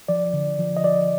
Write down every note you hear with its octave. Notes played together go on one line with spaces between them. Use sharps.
F3 D5
D3
F3
D#5
F3 D5